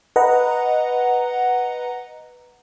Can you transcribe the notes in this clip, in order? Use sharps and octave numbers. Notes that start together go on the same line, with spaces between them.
B4 D#5 F#5 A#5